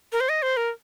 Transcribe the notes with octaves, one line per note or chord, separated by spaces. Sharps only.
A#4
C5
D#5
C5
A#4